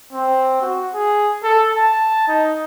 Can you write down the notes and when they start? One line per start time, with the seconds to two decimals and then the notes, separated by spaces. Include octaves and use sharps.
0.13 C4
0.62 F#4
0.94 G#4
1.44 A4
1.75 A5
2.28 D#4